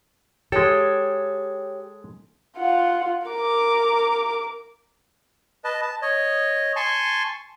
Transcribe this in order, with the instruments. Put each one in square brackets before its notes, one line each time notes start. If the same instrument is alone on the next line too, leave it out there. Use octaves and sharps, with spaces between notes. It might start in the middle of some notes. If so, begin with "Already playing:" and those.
[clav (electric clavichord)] G#3 A4 [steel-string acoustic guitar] G4 C#5 G5
[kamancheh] F4 F#5
A#4 D6
[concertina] B4 D#5 A5
A5
C#5 D#5
G#5 A5 C6 C#6